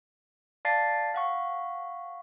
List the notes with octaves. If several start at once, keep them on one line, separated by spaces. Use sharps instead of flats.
D5 F5 A5 A6 C7
F5 F#5 C#6